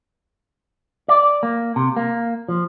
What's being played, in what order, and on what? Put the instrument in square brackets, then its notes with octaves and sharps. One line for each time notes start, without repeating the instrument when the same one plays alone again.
[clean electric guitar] D5
A#3
C3
A#3
F3